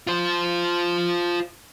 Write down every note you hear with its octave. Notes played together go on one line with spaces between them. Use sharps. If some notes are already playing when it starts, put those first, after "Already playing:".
F4 C5